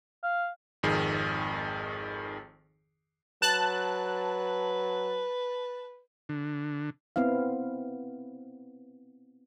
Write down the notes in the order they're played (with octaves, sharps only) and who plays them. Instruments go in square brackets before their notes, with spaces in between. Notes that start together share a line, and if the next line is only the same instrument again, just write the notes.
[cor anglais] F5
[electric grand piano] G#1 F2 D#3 G#4
[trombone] F#3 [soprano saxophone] B4 [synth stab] A5 F#6
[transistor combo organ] D3
[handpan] B3 C4 E4 F5